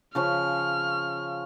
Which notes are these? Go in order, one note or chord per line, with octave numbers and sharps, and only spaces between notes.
C#3 F3 C#4 F6